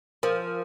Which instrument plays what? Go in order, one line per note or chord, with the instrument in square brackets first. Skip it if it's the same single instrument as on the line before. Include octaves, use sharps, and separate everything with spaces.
[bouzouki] F3 [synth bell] A#4